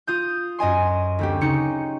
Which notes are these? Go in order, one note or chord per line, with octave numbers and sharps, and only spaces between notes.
F4 D#6 G6
F#2 D#5 G#5 C6
D2 C4 G4
C#3 C#4 D#4 C#7